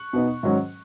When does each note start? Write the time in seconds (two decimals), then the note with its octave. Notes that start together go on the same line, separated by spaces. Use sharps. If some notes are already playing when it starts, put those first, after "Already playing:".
Already playing: C#6 F#6
0.13 B2 B3 D#4
0.43 G#2 D#3 F#3 C#4